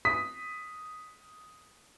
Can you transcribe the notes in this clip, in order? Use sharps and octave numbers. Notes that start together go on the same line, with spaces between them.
D#6 B6